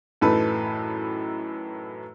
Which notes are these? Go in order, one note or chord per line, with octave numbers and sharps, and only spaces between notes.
F#2 A2 E3 D#4 A4 B4